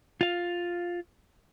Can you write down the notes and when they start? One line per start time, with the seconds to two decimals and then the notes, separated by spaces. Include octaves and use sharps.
0.21 F4 F5